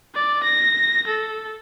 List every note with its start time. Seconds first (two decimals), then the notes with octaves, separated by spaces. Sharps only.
0.14 D5
0.43 A#6
1.07 A4